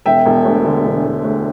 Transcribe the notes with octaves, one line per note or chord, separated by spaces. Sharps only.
E1 E5 G5
E1
D2
D3
E1
E1
D2